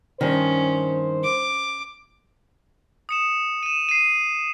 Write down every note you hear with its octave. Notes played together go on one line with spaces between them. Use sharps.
G2 D#3 C#4 C5
D6
D#6 C#7 E7
D#7 E7
C7 D#7